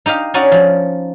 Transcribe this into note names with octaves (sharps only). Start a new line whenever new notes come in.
D#4 G4 D#5 F5
C#4 D#4 F#4 D5 F#5
F3